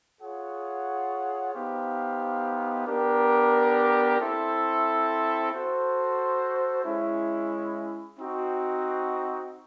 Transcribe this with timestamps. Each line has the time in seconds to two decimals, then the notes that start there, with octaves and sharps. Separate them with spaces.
0.20 F4 G#4 C#5 F#5
1.53 B3 D#4 G4 C5 F5
2.86 B3 D4 G4 A#4
4.19 C4 E4 A4 C5 E5
5.52 F#4 A4 C5
6.84 G#3 C#4 E4
8.18 C4 D#4 F#4